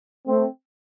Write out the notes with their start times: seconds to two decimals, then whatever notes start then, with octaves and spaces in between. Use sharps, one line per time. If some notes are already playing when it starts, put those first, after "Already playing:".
0.26 A3 C4